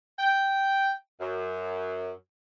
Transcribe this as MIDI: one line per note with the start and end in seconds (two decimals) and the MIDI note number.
0.18 0.91 79
1.20 2.09 42